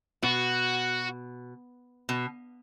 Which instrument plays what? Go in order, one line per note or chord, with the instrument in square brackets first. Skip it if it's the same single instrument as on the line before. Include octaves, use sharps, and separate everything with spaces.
[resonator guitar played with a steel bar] B2 [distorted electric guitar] F#4
[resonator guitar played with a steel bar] B2